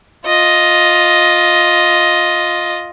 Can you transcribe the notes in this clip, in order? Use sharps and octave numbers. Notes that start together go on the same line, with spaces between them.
F4 D#5